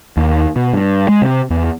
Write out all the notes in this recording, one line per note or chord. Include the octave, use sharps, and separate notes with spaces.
D#2
B2
G2
G#3
C3
E2